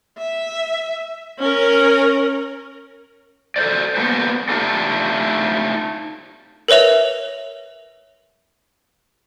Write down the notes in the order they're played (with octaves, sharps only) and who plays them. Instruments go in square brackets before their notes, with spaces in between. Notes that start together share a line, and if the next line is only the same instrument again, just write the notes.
[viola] E5
C#4 A#4
[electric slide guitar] A4 A#4 C5 D5
A#3 B3 F#4 A4 C5
A3 D4 D#4 F4 G4 A4
[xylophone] A#4 B4 C#5 E5 F7